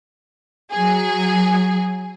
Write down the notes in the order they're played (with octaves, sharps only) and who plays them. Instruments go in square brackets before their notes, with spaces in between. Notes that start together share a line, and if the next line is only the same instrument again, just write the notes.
[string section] F#3 G#4